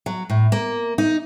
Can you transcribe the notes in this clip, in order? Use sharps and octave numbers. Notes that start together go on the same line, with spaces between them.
F#3
A2
A#3
D#4